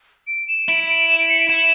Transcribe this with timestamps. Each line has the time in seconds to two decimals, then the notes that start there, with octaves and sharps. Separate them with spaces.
0.27 D7
0.48 E7
0.68 E4 D7
0.83 E7
0.89 D7
1.09 E7
1.19 D7
1.29 C#7
1.40 D7
1.49 E4 E7